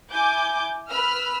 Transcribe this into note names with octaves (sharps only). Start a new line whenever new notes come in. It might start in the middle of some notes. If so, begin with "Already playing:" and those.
E4 G#5 D6 G6
B4 B5 E6 F6